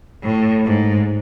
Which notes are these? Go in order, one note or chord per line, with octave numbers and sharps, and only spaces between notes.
A2
G#2